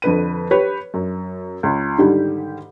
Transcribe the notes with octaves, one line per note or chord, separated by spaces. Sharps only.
F2 D3 B4 D#7
G4 B4 C#5
F#2
C#2
G#2 D3 D#3 G3 G4